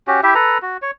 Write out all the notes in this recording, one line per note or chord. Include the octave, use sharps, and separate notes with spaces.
C#4 F#4 G4
E4 G4 E5
A4 B4 A#5
F#4
C#5